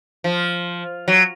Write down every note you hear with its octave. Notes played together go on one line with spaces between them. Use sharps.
F3
F#3